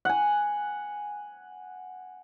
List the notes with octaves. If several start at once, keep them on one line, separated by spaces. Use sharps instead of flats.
F#5 G#5